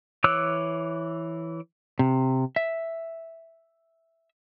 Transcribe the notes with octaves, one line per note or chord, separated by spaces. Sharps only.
E3 C#5 D6 E6 F#6
C3
E5